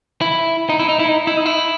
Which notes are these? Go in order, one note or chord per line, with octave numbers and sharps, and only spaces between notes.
E4
D#4
E4
D#4
E4
D#4
E4
D#4
E4